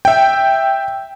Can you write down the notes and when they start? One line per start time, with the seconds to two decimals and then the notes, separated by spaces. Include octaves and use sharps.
0.05 E5 G5